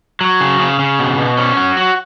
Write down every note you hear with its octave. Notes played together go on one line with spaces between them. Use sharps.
F#3
C#3
C#3
C#3
B2
B2
C#4
F#3
F#4